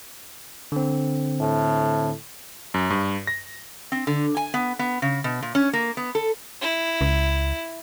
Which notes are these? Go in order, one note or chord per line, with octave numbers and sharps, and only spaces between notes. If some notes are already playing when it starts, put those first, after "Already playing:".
D3 C4
A2
F#2
G2
A#6
C4
D3
G#5
B3
B3
C#3
B2
A#2
C#4
A#3
B3
A4
E4
C#2